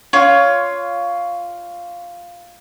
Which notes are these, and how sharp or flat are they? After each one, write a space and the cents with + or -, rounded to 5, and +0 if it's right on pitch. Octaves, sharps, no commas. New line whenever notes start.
F4 +0 C#5 +15